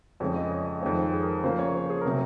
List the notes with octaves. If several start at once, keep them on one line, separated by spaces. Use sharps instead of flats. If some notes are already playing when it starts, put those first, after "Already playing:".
F2 C#3 G#3 C4 C#5
D#5
C#5
D#5
F2 D#3 G#3 C4 C#5
C5
G#4
A#4
C#3 F3 A#3 C5
C#5
C5
G#4
C3 F#3 C4 A#4